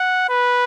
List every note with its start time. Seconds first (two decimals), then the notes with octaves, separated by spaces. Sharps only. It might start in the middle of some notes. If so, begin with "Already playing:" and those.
Already playing: F#5
0.29 B4